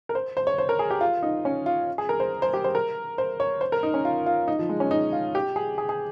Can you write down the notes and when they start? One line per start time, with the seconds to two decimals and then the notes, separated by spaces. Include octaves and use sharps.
0.09 A#4
0.15 C5
0.37 C5
0.47 C#5
0.58 C5
0.69 A#4
0.79 G#4
0.90 G4
1.01 F4
1.23 D#4
1.45 C#4
1.66 F4
1.98 G#4
2.09 A#4
2.20 C5
2.42 C5
2.54 G4
2.64 C5
2.75 A#4
3.18 C5
3.40 C#5
3.61 C5
3.72 A#4
3.83 D#4
3.94 C#4
4.05 F4
4.26 F4
4.48 D#4
4.59 F3
4.69 G#3
4.80 C#4
4.91 D#4
5.13 F4
5.35 G4
5.56 G#4
5.78 G#4
5.89 G#4